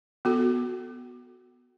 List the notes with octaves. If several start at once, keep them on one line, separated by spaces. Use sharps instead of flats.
B3 F#4 A4